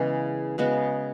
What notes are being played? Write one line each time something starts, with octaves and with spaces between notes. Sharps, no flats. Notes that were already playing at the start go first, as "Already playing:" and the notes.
Already playing: C#3 E3 G#3 B3
C#3 G#3 B3 F#4